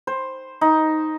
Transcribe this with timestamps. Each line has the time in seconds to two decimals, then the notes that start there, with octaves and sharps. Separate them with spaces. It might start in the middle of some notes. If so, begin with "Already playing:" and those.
0.07 C5
0.61 D#4